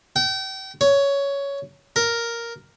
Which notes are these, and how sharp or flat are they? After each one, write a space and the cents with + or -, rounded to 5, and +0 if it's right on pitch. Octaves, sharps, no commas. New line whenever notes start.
G5 -35
C#5 +10
A#4 +0